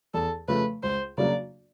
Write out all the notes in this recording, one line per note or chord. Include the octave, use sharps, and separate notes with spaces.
E2 A4
C#3 F3 A3 B4
C#2 C5
C#3 F#3 A#3 D4 D5